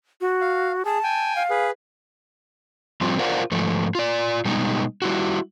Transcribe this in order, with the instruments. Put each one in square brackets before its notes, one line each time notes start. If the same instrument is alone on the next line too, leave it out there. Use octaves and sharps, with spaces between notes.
[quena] F#4
[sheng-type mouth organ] F5
[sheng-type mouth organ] G#4 [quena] A5
[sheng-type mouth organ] G5 G#5
[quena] F5
[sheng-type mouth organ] G#4 B4
[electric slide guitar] F3 G3 C4 F4
F4 A#4 C5 D5 F5 F#5
G#2 F3 A3
F4 D5
B2 G3 G#3 B3 D#4
G3 E4 F#4